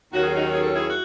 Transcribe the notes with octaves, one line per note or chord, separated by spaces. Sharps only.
D#2 D#3 F#3 C#4 F#4
G#4
D#4 F#4
G#4
A4
E4 G#4
F#4